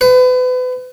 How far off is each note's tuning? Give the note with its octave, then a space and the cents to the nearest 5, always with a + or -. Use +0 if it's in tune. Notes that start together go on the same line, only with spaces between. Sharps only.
B4 +35